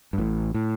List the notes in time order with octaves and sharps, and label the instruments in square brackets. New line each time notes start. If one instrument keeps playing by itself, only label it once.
[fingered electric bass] G2
A1 A2
A2